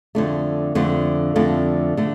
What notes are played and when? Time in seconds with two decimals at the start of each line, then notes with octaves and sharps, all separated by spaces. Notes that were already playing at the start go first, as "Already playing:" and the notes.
0.15 F2 D3 A3
0.75 F2 D3 A3
1.36 F2 D3 A3
1.97 D3 A3